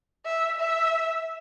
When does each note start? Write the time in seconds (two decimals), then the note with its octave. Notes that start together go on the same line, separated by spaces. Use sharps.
0.25 E5
0.60 E5